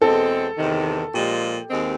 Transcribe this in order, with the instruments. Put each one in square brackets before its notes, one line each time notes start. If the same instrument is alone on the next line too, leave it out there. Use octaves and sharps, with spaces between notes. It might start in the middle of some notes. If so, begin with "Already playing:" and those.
[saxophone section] E2 B2 G#3 C4 [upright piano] A4
[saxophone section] E2 C3 D#3
[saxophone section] A#2 F3 G#3 [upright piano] G4
[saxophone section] D#2 D#3 G#3 C4